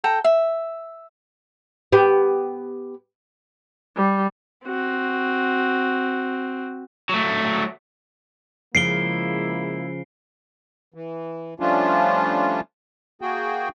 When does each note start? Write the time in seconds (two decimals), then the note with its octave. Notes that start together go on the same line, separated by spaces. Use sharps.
0.04 A4 G5 A#5
0.24 E5
1.92 B3 G4
3.96 G3
4.65 C4 F#4
7.09 F#3 A3
8.75 C#3 F3 G#3 A#3 E4 C7 D7 G7
10.94 E3
11.60 F3 G3 A3 C#4 D4 F4
13.22 A#3 F#4 G#4 G5